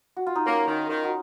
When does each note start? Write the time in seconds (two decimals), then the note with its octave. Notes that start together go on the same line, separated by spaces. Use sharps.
0.17 F#4
0.27 F4
0.36 D#4
0.46 A#3 C#4
0.68 D#3
0.89 D#3
1.04 D#4 F#4